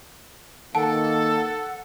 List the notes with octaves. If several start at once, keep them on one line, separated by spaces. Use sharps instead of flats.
D#3 A#3 A4 F#5 A5